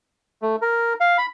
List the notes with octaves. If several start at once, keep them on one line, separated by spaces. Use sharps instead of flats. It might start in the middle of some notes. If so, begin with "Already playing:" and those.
A3
A#4
F5
B5